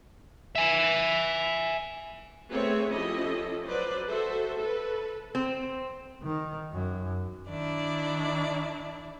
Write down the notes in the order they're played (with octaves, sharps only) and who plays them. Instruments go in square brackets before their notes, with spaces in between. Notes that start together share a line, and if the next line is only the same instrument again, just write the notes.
[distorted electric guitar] E5 G#5
[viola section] A3 B3 C4 G#4 C#5 E5
F3 C#4 E4 G4 A4 D#5
F#3 B4 C5 D5
F#4 A4 C5 E5
A4 B4
[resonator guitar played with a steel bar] C4
[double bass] D#3
F#2
[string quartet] D#3 D4 E4 D5